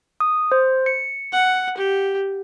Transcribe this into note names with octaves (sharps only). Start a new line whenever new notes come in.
D#6
C5
C#7
F#5
G4